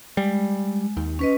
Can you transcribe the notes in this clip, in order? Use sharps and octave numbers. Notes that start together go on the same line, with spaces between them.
G3 G#3
D#2
C#4 B4 D#5